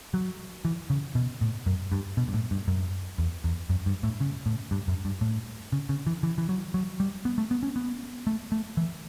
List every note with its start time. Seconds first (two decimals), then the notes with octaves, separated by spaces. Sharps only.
0.14 F#3
0.65 E3
0.90 C#3
1.15 B2
1.41 A2
1.66 F#2
1.92 G2
2.17 B2
2.28 G2
2.34 A2
2.51 G2
2.68 F#2
3.18 E2
3.44 E2
3.69 F#2
3.86 G2
4.03 A2
4.20 C#3
4.46 A2
4.71 G2
4.88 F#2
5.05 G2
5.21 A2
5.72 C#3
5.89 C#3
6.07 E3
6.23 E3
6.38 E3
6.49 F#3
6.74 F#3
7.00 G3
7.25 B3
7.38 A3
7.51 B3
7.63 C#4
7.76 B3
8.27 A3
8.52 A3
8.77 E3